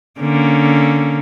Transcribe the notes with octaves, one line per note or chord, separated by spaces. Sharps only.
D3 A#3 C#4